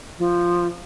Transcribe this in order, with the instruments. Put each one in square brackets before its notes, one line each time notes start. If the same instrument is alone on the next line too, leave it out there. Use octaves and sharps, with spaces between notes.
[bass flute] F3